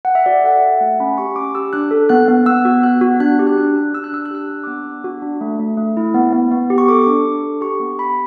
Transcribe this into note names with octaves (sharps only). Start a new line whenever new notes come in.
F#5
E5
F#4 D5
A4 F#5
E5
F#4
F#5
A3
C#4 B5
G4 C#6
C#4 D6
G4 E6
D4 F#6
A4
B3 F#6
B3
B3 E6
F#4
B3 F#6
F#4
D4 F#6
G4
F#6
D4
D4
D4 E6
F#6
D4 E6
F#6
G4 E6
D4
D6
B3 E6
D4
F#4
D4
A3
A3
A3
E4
B3
B3
B3
G4
C#6
A4 D6
D4
D4
A4
G4 C#6
B3
G4 B5